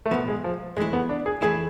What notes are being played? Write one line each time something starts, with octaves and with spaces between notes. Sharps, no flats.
A3
B1 A2 F3 B3
G#3
F3
F2 E3 G#3 A3 E4
B3
D4
G#4
F2 E3 A3 E4 G#4